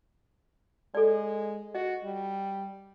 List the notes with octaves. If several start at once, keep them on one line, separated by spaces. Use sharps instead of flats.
G#3 A4 D5
F#4 D#5
G3